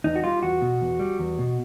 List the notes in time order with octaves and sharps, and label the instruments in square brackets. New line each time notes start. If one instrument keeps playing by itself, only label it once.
[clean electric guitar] E2 D#4
F#4
G3 F4
E2 F#4
B2
E2
G3
E2
B2